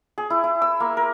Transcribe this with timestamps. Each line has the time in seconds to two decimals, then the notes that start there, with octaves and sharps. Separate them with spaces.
0.18 G#4
0.30 E4
0.44 E4
0.62 E6
0.80 A#3
0.97 A#4